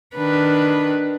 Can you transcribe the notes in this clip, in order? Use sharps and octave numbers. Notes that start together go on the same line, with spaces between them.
D#3 D4 B4